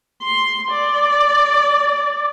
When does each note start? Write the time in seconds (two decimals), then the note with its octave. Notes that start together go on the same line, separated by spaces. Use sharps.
0.23 C6
0.71 D5